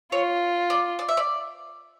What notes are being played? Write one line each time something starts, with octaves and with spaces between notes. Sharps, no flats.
F4 C#5
D5
D5
E5
D5